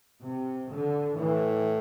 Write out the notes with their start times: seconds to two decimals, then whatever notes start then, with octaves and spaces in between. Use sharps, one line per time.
0.23 C3
0.70 D3
1.16 A2 E3